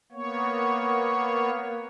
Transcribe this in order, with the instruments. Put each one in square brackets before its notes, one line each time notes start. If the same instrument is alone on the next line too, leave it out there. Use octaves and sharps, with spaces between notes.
[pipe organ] A#3 B3 C#5